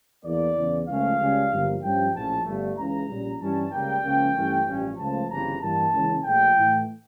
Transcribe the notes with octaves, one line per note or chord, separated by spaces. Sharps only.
E2 E3 A#3 D5
E2 C#3 E3
C#2 C#3 F3 A3 C#4 F5
C#2 C#3 G3 C#4
G1 G2 D3 F3 A#3
G2 F3 C#4 G5
A#1 A2 F3 C#4 A5
G1 G2 D3 A3
C#2 C#3 E3 A#5
A#1 A#2 G3 C#4
G2 E3 G3 C#4 A5
C#2 C#3 G3 A#3 G5
C#2 C#3 F3 A#3 C#4
G2 E3 A3 C#4
A1 G2 F3 C#4
C#2 C#3 F3 A3 A5
G1 F2 C#3 E3 A#5
G2 E3 G3 A#3 A5
C#2 C#3 E3 A#3 C#4
A#1 A#2 A3 G5
A2 E3 A3